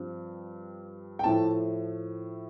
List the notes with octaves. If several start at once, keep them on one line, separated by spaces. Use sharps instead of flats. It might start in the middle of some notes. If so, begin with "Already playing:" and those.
Already playing: G2 F3 C4
G5
A2 F3 A3 A5